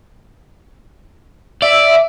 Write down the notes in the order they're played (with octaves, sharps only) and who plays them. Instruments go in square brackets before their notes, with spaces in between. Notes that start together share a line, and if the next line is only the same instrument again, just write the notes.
[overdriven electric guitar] D5 [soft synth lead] E5